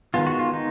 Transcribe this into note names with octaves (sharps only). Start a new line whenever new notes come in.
D#3 G#3 B3 F4
F#4
F4
D#4